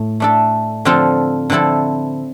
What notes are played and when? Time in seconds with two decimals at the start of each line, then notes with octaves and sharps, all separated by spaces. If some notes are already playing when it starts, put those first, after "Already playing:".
Already playing: A2
0.20 A3 D4 A4
0.85 D3 F3 C4 F4 A4
1.50 D3 F3 C4 E4 A4